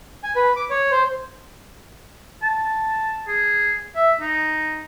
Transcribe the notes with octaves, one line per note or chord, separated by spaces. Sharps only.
G#5
B4
D6
C#5
C5
A5
G#4
E5
D#4